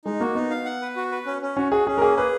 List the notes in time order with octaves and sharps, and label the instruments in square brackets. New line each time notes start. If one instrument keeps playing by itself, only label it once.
[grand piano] G#3 [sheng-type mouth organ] D#4
[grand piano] A#3 [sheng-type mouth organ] F#4
[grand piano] B3 [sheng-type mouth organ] D#4
[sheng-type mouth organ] F5
F#5
B4
F#4
B4
C#4
C#4
[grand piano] C#4 [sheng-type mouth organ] F#4
[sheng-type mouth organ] F#4 [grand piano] G#4
[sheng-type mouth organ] C#4 [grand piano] G#4
[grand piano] A#4
[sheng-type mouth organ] A#3 [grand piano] G#4
[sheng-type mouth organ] G#4 [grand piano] B4